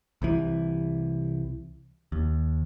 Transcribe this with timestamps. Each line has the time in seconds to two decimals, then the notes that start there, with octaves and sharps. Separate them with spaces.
0.22 C2 C3 E3
2.12 D#2